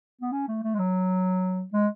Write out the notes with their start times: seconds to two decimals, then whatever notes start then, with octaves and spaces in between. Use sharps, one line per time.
0.22 B3
0.32 C#4
0.48 A3
0.64 A3
0.74 G#3
0.79 F#3
1.73 G#3